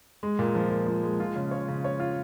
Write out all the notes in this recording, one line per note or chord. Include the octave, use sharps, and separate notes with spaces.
G#3
A#2
F3
A#2
F3
G#3
F4
C#3
C#5
C#3
C#5
F4